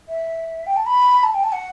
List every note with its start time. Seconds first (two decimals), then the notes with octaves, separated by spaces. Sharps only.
0.09 E5
0.67 G5
0.76 A5
0.86 B5
1.23 A5
1.34 G5
1.44 A5
1.52 F#5